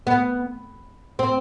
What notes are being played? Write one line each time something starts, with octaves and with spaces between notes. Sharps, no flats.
B3
C4